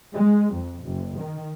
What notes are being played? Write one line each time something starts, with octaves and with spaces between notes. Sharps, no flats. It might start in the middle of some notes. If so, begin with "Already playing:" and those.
G#3
F2
F#1
D#3